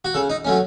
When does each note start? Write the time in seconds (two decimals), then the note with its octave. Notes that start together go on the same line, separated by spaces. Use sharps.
0.05 F#4
0.14 C#3 A4
0.30 D#4
0.45 F#3 A3 C#4